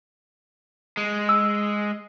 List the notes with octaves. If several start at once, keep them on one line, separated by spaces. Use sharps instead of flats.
G#3
E6